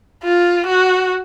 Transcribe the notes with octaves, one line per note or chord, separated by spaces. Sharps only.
F4
F#4